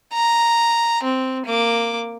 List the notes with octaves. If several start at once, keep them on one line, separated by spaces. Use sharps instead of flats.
A#5
C4
A#3 D6